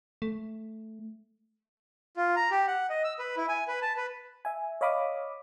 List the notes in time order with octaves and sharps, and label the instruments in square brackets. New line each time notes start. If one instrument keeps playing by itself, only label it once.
[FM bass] A3
[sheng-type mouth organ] F4
A#5
G4
F#5
D#5
E6
B4
E4
G#5
B4
A5
B4
[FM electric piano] E5 G#5
C#5 D#5 F5 B5 D6 D#6